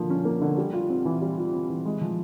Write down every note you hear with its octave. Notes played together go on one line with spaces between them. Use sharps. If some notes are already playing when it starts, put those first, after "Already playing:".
Already playing: D3 F3 A#3
C#4
A#3
D3
G3
F4
C4
E3
G3
F4
C4
E3
G#3
F3